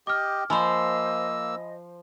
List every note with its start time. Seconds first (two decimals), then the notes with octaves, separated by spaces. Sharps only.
0.07 G4 D#5 G5 D6 F6
0.50 F3 A#3 C5 D#5 G#5 B5 E6